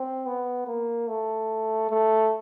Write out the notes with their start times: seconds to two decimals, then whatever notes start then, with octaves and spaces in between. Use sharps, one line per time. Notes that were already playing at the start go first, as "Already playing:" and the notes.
Already playing: C4
0.26 B3
0.67 A#3
1.08 A3
1.90 A3